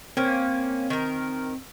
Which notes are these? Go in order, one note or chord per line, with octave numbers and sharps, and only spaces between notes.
A#3 C4 C#4
D#3 A#4